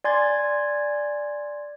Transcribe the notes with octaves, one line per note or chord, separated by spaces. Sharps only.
D5 G#5 C6 G#6 A6